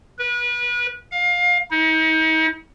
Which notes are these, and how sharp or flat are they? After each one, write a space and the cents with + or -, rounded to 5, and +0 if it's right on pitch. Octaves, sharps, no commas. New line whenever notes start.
B4 -30
F5 +25
D#4 +40